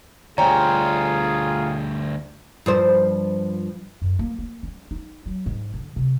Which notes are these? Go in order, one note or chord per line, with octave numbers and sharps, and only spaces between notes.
D2 G3 F4 G#4 C#5 G5 G#5 A#5
G2 F3 C5
F#2
A#3
A#3
C#4
D#4
F#3
G#2
D3
C3